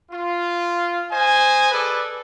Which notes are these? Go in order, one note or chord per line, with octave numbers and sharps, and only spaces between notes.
F4
C5 D#5 G#5
G#4 A4 B4 D5